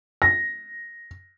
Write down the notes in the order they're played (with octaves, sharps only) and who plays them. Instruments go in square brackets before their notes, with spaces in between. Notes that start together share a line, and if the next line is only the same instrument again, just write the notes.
[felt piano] A#6